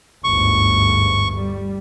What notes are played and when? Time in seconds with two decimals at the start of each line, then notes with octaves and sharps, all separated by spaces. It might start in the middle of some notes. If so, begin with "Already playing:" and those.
0.24 G1 D2 G#2 C#6
1.35 G3